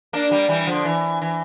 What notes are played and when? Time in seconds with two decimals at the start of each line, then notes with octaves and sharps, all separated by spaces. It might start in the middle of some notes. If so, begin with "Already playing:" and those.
0.13 A#3 D4
0.31 G3 A#3
0.49 E3 G3
0.67 D3 F3
0.85 E3
1.22 E3